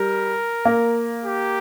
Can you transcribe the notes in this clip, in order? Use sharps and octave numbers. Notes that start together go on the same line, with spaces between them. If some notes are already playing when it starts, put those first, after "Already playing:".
Already playing: G3 A#4
A#3
G4